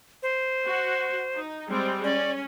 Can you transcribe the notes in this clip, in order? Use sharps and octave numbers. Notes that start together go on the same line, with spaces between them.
C5
F#4
D#4
G3 G#3 C4
C#4 D5